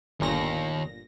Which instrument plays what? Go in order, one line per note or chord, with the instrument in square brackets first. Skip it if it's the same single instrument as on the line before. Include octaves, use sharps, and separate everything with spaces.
[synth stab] G1 A#2 A#6 [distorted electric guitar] D#2